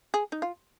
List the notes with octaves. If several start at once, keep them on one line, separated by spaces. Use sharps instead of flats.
G#4
D#4
F4